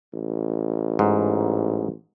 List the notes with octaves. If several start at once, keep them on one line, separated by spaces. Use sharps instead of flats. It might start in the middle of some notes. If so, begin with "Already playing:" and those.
A1
G#2